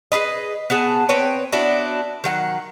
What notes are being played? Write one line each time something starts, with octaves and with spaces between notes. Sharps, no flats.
G#4 A4 B4 D#5
B3 F#4 G#4 A5
C4 B4 C#5 G5
B3 D4 E4 F#4
D#3 F#3 F#5